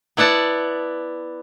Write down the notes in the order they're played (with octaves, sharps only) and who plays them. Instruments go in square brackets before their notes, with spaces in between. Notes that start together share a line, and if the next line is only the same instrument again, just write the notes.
[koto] B3 E4 D5 F#5 A5